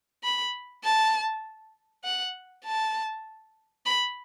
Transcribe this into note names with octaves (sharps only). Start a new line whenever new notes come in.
B5
A5
F#5
A5
B5